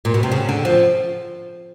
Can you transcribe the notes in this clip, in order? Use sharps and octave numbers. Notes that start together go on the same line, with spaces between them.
A#2
B2
C3
C#3
D3
F3